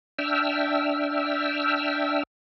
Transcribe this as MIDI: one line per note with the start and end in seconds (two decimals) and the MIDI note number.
0.19 2.23 62
0.19 2.23 76
0.19 2.23 79
0.19 2.23 88
0.19 2.23 89